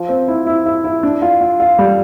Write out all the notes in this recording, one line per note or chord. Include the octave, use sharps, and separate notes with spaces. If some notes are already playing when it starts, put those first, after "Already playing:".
Already playing: F3
C4
E4
E4
E4
E4
D4
F4
F4
F4
G3